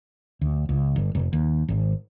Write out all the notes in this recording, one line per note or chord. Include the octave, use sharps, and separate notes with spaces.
D2
C#2
G1
F1
D#2
G#1